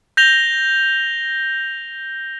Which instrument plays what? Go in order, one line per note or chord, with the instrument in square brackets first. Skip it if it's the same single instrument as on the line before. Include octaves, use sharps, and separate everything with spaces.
[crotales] G6 A#6 F7 G7